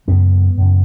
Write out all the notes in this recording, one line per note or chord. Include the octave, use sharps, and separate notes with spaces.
F#2 C#3 G#3 B3
F#2 C#3